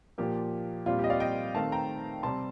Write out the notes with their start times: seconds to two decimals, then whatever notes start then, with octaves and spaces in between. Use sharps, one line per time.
0.18 A#2 F3 A#3 G4
0.86 A#2 G3 C4 F4
0.99 G4
1.04 D#5
1.10 D5 F5
1.20 D#5 G5
1.55 D#3 A3 C4 F5 A5
1.72 G5 A#5
2.23 C3 G3 C4 A5 C6